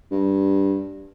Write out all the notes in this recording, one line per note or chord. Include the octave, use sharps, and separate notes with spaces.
G2